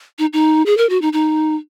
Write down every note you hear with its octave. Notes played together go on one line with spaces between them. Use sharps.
D#4
D#4
G#4
A#4
F#4
D#4
D#4